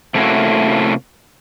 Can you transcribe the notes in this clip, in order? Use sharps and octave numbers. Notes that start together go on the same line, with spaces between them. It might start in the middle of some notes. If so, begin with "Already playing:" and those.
C3 A3 A#3 C#4 E4 F#4